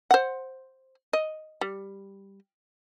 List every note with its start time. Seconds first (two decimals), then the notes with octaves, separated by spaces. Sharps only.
0.11 C5 F#5
1.13 D#5
1.61 G3